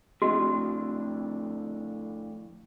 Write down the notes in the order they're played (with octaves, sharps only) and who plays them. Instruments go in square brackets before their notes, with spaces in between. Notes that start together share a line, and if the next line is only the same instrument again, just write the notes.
[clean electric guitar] F2 A2 D3 [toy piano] F#4